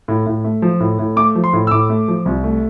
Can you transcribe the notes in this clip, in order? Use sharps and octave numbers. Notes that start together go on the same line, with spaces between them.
A2
A2
A3
F3
A2
A2
A3 D6
F3
C6
A2
E6
A2 D6
A3
F3
C2
A3